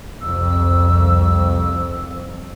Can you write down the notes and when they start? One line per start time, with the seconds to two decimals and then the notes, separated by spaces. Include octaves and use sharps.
0.21 C2 F2 E6